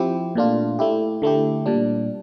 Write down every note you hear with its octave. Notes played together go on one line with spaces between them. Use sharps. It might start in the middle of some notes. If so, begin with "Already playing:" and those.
Already playing: F3 C4 E4 G4
A#2 A3 D4 F4
A3 E4 G4
D3 A3 E4 G4
A#2 G3 D4